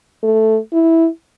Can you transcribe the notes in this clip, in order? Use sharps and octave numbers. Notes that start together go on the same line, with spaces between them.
A3
E4